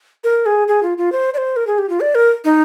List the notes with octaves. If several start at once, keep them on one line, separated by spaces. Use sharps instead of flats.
A#4
G#4
G#4
F4
F4
C5
D5
C5
A#4
G#4
G4
F4
D5
A#4
D#4